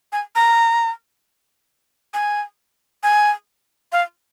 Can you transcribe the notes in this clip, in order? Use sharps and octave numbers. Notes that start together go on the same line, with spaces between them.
G#5
A#5
G#5
G#5
F5